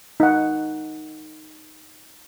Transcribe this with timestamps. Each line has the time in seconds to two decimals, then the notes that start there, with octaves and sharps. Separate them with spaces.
0.20 D#4 F#5